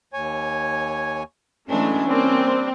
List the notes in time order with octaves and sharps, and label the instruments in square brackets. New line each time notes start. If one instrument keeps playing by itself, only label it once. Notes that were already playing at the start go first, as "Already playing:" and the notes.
[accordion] D#2 C#5 G#5
[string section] E3 A3 D4 [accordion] F#3 G#3 [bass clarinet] C#4
[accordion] G3 D4 [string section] A#3 [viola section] C4